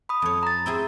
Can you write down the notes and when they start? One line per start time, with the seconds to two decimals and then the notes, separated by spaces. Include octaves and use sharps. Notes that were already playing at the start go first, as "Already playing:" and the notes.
0.09 B5 D#6
0.22 F2 C#5
0.43 A#5 A6
0.66 C4 E4 G#4